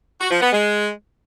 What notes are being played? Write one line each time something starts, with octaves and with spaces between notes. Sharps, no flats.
F#4
F3
B3
G#3